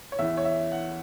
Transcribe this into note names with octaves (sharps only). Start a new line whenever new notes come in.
C#5
E2 E3 E5
C#5
E5
F#5